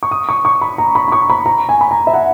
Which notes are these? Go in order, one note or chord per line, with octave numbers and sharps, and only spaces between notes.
C#6
D#6
C#6
C#6
B5
A#5
B5
B5
C#6
B5
A#5
G#5
B5
A#5
E5
F#5